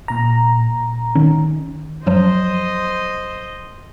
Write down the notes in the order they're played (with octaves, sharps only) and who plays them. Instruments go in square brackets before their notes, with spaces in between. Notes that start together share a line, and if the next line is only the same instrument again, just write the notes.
[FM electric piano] A#2 A#5
[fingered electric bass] D#3 C#4
[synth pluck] F#2 F3 F#3 [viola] C5 D#5